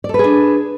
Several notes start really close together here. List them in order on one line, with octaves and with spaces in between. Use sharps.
D5 A4 B4 G#4 D4